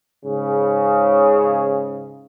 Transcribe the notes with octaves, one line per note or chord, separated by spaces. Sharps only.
G#2 C#3